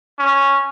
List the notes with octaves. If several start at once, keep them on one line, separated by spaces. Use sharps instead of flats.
C#4